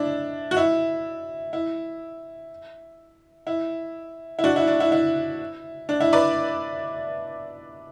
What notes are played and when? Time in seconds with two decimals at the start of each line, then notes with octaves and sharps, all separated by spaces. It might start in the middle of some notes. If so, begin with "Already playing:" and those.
Already playing: D4 E4
0.51 F#4
0.57 E4
1.53 E4
3.47 E4
4.39 E4
4.44 D4 F#4
4.56 E4
4.67 D4
4.80 E4
4.92 E4
5.89 D4
6.01 E4
6.13 B4 D5